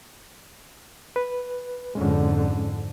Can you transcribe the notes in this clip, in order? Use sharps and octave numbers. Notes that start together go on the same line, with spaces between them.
B4
F2 G#2 D3 G#3 C#4